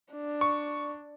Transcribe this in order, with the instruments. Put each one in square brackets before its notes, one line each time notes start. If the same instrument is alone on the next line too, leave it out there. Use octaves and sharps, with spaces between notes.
[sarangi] D4
[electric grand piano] C#6